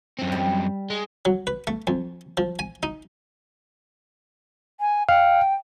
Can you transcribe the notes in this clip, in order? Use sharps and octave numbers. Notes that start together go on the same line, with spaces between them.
F#2 C4
G3
G#3
F#3
B4
A3
F2
F3
G#5
D#4
G#5
F5 G5